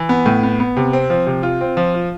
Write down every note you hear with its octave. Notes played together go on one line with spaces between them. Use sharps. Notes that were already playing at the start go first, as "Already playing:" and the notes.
Already playing: E3
B3
A2
B3
B3
C3
C4
F3
C3
F4
C4
F3
F4